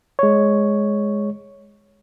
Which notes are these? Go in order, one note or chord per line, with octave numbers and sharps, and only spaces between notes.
G#3 C#5